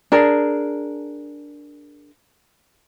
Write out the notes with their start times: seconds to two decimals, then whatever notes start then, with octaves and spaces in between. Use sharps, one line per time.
0.12 D4 G#4 A#4